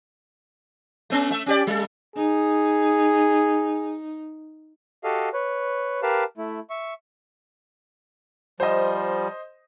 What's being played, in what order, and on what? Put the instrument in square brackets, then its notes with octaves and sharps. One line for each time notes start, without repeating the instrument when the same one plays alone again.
[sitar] A3 B3 C#4
A3 E5
C#4 G4 D5
G3 A4
[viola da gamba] D#4 [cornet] G#4
[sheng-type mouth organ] F#4 G4 A4 D#5 F5
B4 C#5
G4 A#4 B4 F5 A5
A3 E4
E5 C#6
[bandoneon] F3 G3 [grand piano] C5 D#5